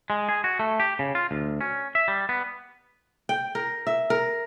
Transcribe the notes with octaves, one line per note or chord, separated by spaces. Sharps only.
G#3
G#4
F#4
A3
G4
C#3
F4
D2
C#4
E5
G3
B3
G5
A#4
E5
A#4